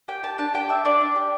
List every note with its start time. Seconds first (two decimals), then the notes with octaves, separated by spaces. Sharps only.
0.08 G4 G5
0.23 G4 A5
0.38 D4 A5
0.54 G4 G5
0.69 D4 E5
0.85 D4 D5
1.01 D4
1.16 G4